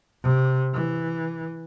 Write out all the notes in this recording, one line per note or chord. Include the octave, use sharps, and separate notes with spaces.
C3
E3